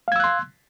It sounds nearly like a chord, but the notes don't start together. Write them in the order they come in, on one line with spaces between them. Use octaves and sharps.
F5 G#6 E6 F#6 C6